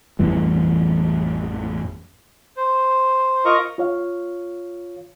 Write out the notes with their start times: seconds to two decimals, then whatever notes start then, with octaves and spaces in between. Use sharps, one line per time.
0.19 A1 F2 E3 G3
2.57 C5
3.45 F4 A#4 D#5 A#5 C#6
3.78 F4 C#5 F5